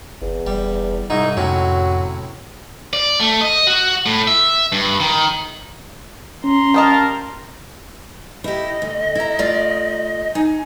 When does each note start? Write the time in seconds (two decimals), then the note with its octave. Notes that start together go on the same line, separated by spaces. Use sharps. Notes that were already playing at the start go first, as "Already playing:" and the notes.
0.21 G1 E2
0.47 F1 G3
1.10 C2 G#2 D#4 E4
1.37 F2 A2 C3 F#3 C#4
2.93 D5
3.20 A3
3.41 D#5
3.67 F#4
4.06 A2
4.27 E5
4.72 G2
5.00 D#3
6.44 C#4 A#5 C6
6.74 G3 A#4 D#5 F5 A5
8.44 E4 G4 D#5
8.82 D2
9.15 E4 A#5
9.39 A3 F4 D5
10.35 D#4 G#5